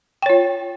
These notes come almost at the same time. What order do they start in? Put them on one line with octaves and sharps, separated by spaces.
G5 C#5 F4